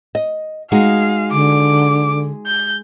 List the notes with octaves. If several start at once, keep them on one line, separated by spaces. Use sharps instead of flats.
D#5
G#3 D#4 F#4 F5
D3 D6
G6